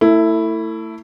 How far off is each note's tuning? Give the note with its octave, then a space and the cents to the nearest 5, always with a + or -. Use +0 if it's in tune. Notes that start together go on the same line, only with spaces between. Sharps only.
A3 +30 E4 +0